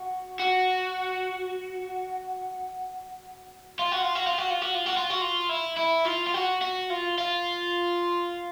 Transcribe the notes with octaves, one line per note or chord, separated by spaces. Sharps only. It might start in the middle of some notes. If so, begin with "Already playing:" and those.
Already playing: F#4
F#4
F4
F#4
F4
F#4
F4
F#4
F4
F#4
F4
F#4
F4
F#4
F4
E4
E4
F4
F4
F#4
F#4
F4
F4